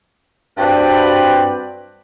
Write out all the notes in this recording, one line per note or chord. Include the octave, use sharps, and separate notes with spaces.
G2 C4 F#4 B4 D5 G5